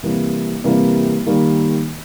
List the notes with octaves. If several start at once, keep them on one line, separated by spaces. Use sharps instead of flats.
C3 E3 G3 A#3
C3 E3 G3 A#3
D#3 G3 A#3